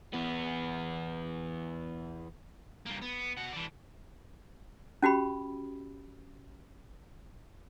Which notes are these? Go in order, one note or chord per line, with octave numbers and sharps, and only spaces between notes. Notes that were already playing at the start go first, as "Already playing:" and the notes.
E2 B3
G2 A#3
B3
B2 F#5
E3 D4
C#4 F#4 G4 B5